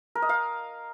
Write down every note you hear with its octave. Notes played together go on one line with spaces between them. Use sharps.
A#4
D#5
F5